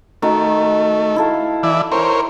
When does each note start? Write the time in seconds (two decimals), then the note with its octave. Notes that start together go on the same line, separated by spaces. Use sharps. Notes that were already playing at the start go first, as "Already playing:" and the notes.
0.22 D#3 A3 F#4
1.16 E4 A4 F5
1.63 E3 D5 E5
1.92 E4 A#4 C5 C#5 G5